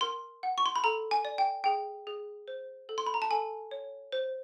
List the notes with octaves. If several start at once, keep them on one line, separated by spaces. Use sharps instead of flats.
A#4 C6
F#5
C#6
C6
B5
A4 A#5
G#5
D5
G5
G#4 G5
G#4
C5
A4
C6
B5
A#5
A5
A4 G#5
C#5
C5